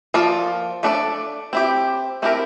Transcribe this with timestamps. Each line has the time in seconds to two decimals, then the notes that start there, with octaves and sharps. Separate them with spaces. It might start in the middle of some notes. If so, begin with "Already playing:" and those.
0.14 F3 A#3 F4 A4 D5
0.83 A3 D4 A4 D5
1.53 C4 E4 G4
2.22 A3 C4 E4 G4 A#4